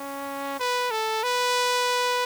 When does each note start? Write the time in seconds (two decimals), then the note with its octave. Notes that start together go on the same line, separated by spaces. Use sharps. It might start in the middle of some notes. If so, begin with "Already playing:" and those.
Already playing: C#4
0.60 B4
0.91 A4
1.23 B4